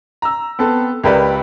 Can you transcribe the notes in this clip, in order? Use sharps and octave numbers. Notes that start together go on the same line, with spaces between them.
A#5 E6
B3 C4 A4
C#2 G4 A#4 B4 D5